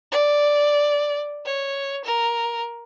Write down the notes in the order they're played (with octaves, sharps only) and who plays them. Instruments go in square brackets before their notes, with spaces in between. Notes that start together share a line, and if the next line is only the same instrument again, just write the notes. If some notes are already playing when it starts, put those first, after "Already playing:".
[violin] D5
C#5
A#4